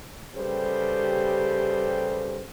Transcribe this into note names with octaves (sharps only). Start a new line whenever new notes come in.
C#3 G3 G4 A4 B4 C5